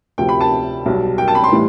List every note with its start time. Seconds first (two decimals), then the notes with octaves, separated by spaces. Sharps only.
0.18 D2 C3 F3 G5
0.29 B5
0.41 A5
0.86 B1 B2 G3
1.18 G5
1.28 A5
1.35 B5
1.44 C6
1.52 A2 E3 G3